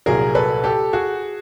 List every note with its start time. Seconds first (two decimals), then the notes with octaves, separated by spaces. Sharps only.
0.06 C2 A#2 F#3 G#4 A#4
0.35 A4 B4
0.64 G4 A4
0.93 F#4 G#4